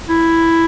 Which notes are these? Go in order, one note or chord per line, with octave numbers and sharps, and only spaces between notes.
E4